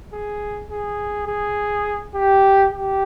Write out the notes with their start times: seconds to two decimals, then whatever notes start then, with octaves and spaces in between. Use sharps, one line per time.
0.13 G#4
0.71 G#4
1.27 G#4
2.14 G4
2.72 G4